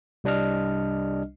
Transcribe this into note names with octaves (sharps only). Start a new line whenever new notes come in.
C2 G3 D4 D#5 F6